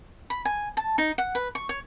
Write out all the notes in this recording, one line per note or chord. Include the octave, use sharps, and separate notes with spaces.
B5
G#5
A5
D#4
F#5
B4
C#6
C#5